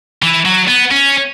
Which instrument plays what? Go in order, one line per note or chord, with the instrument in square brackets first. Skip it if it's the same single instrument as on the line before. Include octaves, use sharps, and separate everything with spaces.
[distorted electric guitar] E3
F#3
B3
C#4